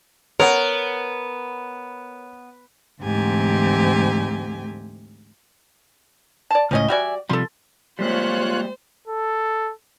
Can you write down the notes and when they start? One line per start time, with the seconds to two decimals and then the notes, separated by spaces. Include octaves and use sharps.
0.40 B3 A#4 C#5 F#5
3.01 D2 G#2 E3 C4 G4 G#5
6.51 D5 A5
6.71 C#2 A2 F3 C#4 D#5
6.88 G3 F#4 D5 E5 G#5
7.29 C3 F3 G3 A4 C6
7.99 G3 G#3 A#3 F4 C5 C#5 F#6
9.08 A4